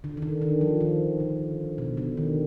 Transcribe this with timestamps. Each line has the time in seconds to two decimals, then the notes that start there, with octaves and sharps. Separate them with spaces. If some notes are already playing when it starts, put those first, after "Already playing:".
0.04 D3
0.17 D#3
0.22 D3
0.42 D#3
0.61 F3
0.81 D#3
1.20 D3
1.78 B2
1.97 D3
2.17 D#3